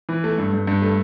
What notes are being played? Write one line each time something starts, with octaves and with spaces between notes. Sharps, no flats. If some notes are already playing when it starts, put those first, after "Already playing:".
E3
A3
G2
G2
G2
A3